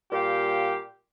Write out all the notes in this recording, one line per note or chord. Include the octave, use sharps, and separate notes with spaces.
A#2 G3 G4 F5 G5